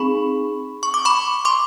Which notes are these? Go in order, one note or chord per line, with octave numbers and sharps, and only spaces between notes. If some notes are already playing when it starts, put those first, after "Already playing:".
Already playing: C4 D#4 G#4 B5 C#6
C#6
D6
B5 C#6
C6 D6